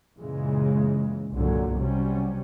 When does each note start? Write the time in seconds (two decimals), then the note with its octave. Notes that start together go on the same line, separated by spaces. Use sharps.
0.18 F#2 A#2 C#3 E3 G#3
1.32 C2 G2 A#2 D3 F#3
1.77 C3 F#3 G3 C#4